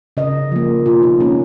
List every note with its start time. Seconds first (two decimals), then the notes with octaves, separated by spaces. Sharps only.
0.17 C#3 D#5
0.52 F3 A#3
0.86 B2 F4
1.03 D#4
1.20 A#3 C#4